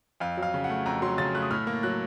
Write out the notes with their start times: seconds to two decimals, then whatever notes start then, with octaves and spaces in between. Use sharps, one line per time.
0.20 F2 F5
0.37 F#3
0.43 F5
0.54 C#3
0.64 F#5
0.70 A3
0.86 F2 A#5
1.02 F#3 C6
1.18 C#3 A6
1.34 A3 F#6
1.42 D#6
1.51 A2 F6
1.67 A#3
1.83 F#3 F#6